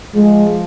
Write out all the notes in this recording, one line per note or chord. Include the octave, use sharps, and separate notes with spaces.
F3 G#3